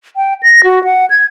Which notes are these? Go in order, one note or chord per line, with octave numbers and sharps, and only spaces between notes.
G5
A#6
F#4
F#5
G#6